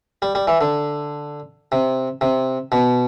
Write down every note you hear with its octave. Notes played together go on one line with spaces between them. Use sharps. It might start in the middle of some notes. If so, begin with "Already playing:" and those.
G3
G3
E3
D3
C3
C3
B2